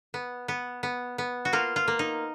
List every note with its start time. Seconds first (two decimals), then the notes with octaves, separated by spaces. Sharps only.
0.14 B3
0.48 B3
0.83 B3
1.18 B3
1.45 F#4
1.53 A#3 F4
1.76 F4
1.88 A#3
1.99 D#4